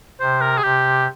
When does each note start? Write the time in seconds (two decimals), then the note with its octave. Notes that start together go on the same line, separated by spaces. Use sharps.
0.20 C3 C5
0.41 A#4
0.58 G#4
0.63 C3 G4